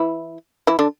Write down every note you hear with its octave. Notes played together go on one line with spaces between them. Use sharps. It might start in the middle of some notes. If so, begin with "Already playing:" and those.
Already playing: E3 E4
E3 E4
D3 D4